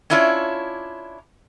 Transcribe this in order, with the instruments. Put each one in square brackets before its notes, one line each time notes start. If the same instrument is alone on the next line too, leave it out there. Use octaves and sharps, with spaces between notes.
[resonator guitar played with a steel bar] C#4 D4 E4 F4 C#5 D5